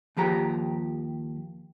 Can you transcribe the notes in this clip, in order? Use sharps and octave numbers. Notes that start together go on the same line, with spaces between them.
D#2 F3 G4 A#5